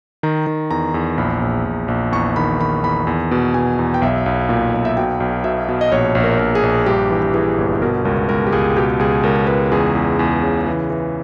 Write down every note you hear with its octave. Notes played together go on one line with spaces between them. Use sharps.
D#3 A#5
D#3
E2 A#5
E2
A#1 B5
A#1
A#1
A#1
E2 C#6
D#3 B5
D#3 B5
E2 B5
E2
B2
B2 G#5
E2
G5
B1 E5
B1
A#2
B1
E5
B2 G5
B1
B2 E5
B2
D#5
A#1 C#5
A#1
A#4
A#1
G#4
A#1
G2 G4
E3
G4
E3 G#4
G1
B2 A#4
C#2 A#4
C#2 A#4
G4
C#2 G#4
B2 G4
C#2 G#4
C#2 A#4
C#2 B4
E2 G#4
E2
E2
C#3
E3
E3